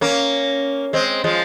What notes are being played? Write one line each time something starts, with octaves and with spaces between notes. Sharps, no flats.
A#3 C#4
G#3 C4
F3 G#3